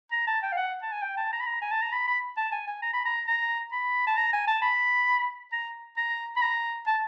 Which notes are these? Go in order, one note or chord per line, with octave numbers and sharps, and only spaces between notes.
A#5
A5
G5
F5
F#5
A5
G#5
G5
A5
A#5
B5
A#5
G#5
A5
A#5
B5
B5
A5
G#5
G#5
A#5
B5
A#5
A#5
B5
A5
A#5
G#5
A5
B5
A#5
A#5
B5
A#5
A5